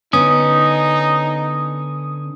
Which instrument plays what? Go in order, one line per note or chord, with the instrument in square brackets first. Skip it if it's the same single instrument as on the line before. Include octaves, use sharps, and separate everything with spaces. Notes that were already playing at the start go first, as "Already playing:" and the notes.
[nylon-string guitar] D3 B3 [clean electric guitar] C#4 [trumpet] D#4 [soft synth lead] D#6